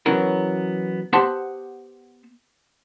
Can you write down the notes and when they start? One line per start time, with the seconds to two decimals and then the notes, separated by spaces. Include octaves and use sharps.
0.06 E3 F#3 B3 C#4 A#4
1.13 B3 G4 C5 F#5 A5 C6